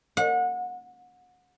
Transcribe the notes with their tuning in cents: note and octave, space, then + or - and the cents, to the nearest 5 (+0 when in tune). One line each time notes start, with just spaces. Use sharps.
F#5 -30